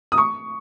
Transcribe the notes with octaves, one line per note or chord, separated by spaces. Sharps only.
D#6
C#6